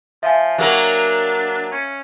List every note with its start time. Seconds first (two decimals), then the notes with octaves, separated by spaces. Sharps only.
0.23 F3 E5 F5 G#5
0.58 F#3 A#3 D4 A#4
1.72 C#4